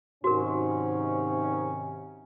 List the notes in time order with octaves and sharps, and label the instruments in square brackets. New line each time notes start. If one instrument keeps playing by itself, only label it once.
[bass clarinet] G#2 [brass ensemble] C3 D#3 C#4 [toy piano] F#4 A#4